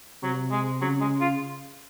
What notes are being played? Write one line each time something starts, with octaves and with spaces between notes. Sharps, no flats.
C3 F#3
G#3
C#3 F#3
G#3
F4